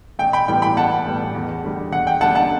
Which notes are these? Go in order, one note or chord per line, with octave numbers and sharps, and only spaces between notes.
A1 G5
G5 B5
A2 E3 G3 B3 G5
G5 B5
A1 F#5 A5
A2 E3 G3 B3
E2
D3 G3
E2 F#5
G5
D3 G3 F#5 A5
F#5 A5